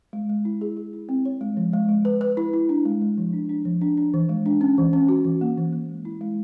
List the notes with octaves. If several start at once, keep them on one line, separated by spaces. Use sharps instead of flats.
G#3
G#3
E4
G#4
G#4
E4
C4
C#5
G#3
F3
G#3
G#3
B4
B4
E4
E4
D4
G#3
G#3
F3
D4
D4
F3
D4
D4
E3
G#3
D4
C#4
E3
C#4
F#4
E3
A#3
E3
A#3
G#3
E4
G#3